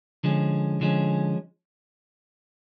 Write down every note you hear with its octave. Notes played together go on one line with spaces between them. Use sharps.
D3 F3 G#3 C#4
D3 F3 G#3 C#4